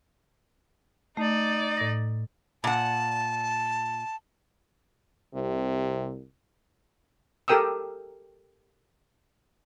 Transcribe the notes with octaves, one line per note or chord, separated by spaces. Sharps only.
A3 D#4 D5
A2 A#6
A#2 F#5 A5
C2 C3
G4 A4 A#4 G5 D#6 E6